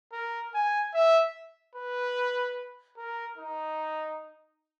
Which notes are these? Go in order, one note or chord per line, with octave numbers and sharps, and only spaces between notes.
A#4
G#5
E5
B4
A#4
D#4